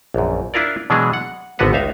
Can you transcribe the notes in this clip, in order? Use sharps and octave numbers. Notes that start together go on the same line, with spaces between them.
A#1 F#2
D4 E4 F4 A#4 D5
B2 E3 F#3 G#3 D4 G#4
F#5
G#1 D3 B3 F#4 B4 F#5
C#2 D#4 E5 F5